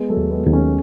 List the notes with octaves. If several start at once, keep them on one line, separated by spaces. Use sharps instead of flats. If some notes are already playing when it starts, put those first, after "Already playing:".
Already playing: G#3 B3
F#3 A3
D#2
G#3 B3
D#2
A3 C#4